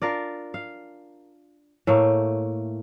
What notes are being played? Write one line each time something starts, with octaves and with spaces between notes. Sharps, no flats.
D4 F4 A#4 D5
F5
A2 A3 A#3